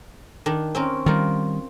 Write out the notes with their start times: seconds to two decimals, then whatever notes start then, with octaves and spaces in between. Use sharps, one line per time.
0.46 D#3 D4
0.75 C4 C#4 A#4
1.06 D#3 G3 F4 A#4